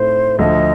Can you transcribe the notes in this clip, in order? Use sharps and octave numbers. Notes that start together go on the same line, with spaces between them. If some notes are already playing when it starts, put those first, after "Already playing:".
Already playing: A2 A3 C4 D#4 C5
D2 D3 F3 D#5